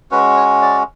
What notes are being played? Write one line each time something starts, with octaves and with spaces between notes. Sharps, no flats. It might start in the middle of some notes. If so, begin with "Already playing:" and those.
G#3 C#4 F#4 B4
C#5
D5